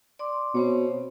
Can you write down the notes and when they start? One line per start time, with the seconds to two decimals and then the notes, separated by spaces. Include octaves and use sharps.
0.19 D5 C6 D6
0.55 B2 C4 C5 C#5